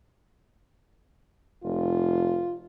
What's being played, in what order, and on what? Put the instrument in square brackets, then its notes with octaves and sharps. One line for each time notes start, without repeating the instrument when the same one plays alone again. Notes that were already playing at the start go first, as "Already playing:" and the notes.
[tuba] F1 [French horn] F4